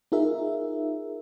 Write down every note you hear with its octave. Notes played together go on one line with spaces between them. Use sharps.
D#4 F4 G#4 A#4 E5